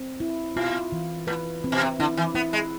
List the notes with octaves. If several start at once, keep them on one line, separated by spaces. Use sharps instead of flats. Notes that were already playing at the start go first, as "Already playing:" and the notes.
Already playing: C4
E4
B2 F4
E3
A2 B4
C4
B2
C3
D3 E4
E3
B3 E4
G#3